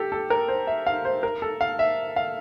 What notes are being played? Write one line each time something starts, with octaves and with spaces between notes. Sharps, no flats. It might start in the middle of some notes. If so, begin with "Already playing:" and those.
Already playing: G4 A4
A4
A#4
C5
E5
F5
C5
A#4
A4
F5
E5
F5